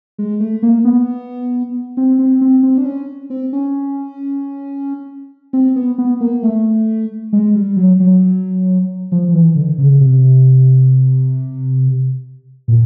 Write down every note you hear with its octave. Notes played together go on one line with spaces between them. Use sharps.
G#3
A3
A#3
B3
C4
C4
C4
C4
D4
C#4
C4
C#4
C4
B3
B3
A#3
A3
G#3
G3
F#3
F#3
F3
F3
E3
D3
C#3
C3
A#2